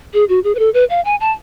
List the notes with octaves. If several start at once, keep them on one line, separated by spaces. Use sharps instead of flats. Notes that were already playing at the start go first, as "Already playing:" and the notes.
G#4
F#4
G#4
B4
A4
B4
F5
G#5
A5